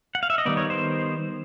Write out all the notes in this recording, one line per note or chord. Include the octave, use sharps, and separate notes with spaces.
F#5
F5
E5
D#5
D#3 G3 B3 D#4 D5
C#5
C5